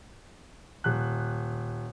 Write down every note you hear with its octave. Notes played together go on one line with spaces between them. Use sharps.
D#1 F#6